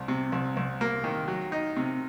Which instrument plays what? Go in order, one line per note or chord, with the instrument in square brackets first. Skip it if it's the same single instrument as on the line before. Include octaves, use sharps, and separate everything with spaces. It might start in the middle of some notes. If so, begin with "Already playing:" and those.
Already playing: [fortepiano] C2
C3
C2
C2
A#3
D#3
F#3
D#4
C3